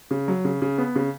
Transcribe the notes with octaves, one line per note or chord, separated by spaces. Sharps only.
C#3
F#3
C#3
C#3
B3
C#3